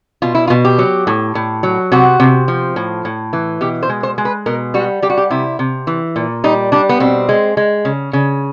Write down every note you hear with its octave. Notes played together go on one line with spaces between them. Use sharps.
B2 F4
E4
F4
B2
G4
F#3
A2
A2
F#3
C3 F#4
C3
F3
A2
A2
E3
B2 G4
C5
G#3
C5
G#3
B4
B2 A#4
G3 F#4
G3 G4
F#4
G4
C3 E4
C3
E3
A#2
G3 D#4
G3 D4
B3
B2 C4
G#3
G#3
C#3
C#3